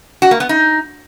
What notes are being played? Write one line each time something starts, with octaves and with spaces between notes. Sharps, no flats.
F#4
A#3
B3
D#4